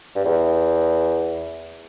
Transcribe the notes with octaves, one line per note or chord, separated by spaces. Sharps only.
G2
E2